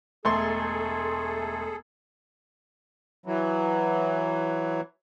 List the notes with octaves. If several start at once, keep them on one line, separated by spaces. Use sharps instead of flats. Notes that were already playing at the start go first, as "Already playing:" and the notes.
E1 A3 G#4 A4 C6
E3 F#3